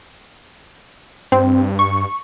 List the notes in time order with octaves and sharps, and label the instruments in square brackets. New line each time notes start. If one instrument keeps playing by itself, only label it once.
[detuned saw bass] G2 [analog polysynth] C4
[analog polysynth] C#6